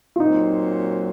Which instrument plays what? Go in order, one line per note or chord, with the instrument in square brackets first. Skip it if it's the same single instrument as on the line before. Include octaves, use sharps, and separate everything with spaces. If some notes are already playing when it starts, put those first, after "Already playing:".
[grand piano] F4
[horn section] A#2 F#3 C4 [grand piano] D#4